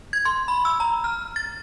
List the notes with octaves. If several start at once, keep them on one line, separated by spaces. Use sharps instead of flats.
G#6
C6
B5
E6
A#5
F6
A6